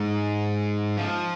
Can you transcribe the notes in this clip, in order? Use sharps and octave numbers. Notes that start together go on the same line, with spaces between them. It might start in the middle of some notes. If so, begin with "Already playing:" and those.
Already playing: G#2
F3